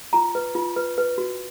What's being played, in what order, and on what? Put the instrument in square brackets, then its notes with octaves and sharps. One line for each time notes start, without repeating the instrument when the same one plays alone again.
[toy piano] F4 A#5
B4
F4
B4
B4
F#4